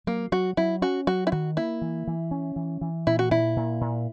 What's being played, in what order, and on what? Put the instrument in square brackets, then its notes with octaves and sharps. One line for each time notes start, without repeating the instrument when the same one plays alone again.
[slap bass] F#3 [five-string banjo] A#3
[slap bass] F#3 [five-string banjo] F#4
[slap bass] F#3 [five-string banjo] E4
[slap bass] C#4 [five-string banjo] F#4
[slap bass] F#3 [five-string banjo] F#4
[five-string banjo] E4
[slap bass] D#3 [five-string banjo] F#4
[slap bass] A#3 [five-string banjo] E4
[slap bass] E3
E3
C#4
E3
E3
[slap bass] A#2 [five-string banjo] E4
[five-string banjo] F#4
[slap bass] A#2 [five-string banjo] E4
[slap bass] A#2
A#2